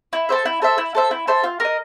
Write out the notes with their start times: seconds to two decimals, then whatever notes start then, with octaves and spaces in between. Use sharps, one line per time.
0.13 E4
0.29 A4 C5 E5
0.45 E4
0.62 A4 C5 E5
0.78 E4
0.95 A4 C5 E5
1.11 E4
1.27 A4 C5 E5
1.44 F4
1.60 A#4 D#5